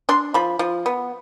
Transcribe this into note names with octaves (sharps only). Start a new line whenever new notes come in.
D4 C6
F3 B5
F3
B3